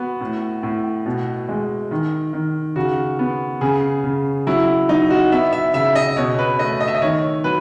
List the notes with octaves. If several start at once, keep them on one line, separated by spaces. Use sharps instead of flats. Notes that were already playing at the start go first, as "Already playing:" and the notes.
Already playing: B3 F#4
A2
A2
B2
G#3
D#3
D#3
C#3 F#4
B3
C#3 G#4
C#3
F#3 E4
F#3 D#4
F#4
B3 E5
E5
C#3 E5
D#5
B2 C#5
B4
A3 D#5
D#5
E5
D#5
D#3 C#5
F#3 B4